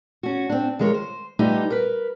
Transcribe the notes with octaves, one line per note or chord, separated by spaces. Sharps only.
C#4 F#4
C4 D4
D#3 F3 G#3 A#4 C#5
C5
G3 A3 B3 D#4 F4 G4
A#4 B4